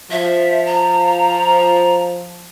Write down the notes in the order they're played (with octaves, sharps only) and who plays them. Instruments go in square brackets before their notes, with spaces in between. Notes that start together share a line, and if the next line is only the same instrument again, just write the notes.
[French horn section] F3 [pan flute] E5
[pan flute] A#5